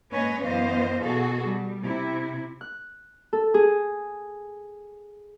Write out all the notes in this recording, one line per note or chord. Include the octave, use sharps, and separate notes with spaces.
G#2 A#3 C#4 B4 C#5 D#5
F#2 E3 B3 C5 D#5 F5
B2 F#4 G#4 A4
G3
C3 E4
F#6
A4
G#4